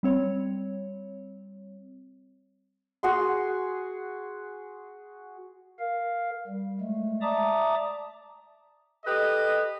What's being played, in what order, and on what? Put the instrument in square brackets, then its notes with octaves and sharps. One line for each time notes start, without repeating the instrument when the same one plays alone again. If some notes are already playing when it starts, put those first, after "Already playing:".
[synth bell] G3 C4 C#5
[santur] F#4 G#4 F#5 C6
[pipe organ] A#4 F5
G3
G#3 A3
D5 E5 A5 A#5 D6 D#6
[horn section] G4 A4 B4 D#5